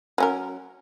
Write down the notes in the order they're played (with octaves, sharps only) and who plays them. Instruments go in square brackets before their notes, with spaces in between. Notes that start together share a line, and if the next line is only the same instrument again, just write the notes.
[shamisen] F#3 C#4 A#4